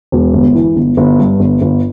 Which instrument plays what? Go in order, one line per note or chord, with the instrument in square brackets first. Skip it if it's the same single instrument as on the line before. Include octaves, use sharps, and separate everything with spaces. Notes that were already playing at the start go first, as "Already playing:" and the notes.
[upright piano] E1
G1
E3
G1
G1
G2
G1
G1